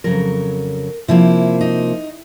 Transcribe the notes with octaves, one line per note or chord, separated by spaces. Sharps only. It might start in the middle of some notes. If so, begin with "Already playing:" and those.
F2 C#3 F#3 A#4
C3 F3 A#3 E4
D#4